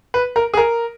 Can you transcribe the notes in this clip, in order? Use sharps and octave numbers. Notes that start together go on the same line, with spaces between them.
B4
A#4
G#4
A#4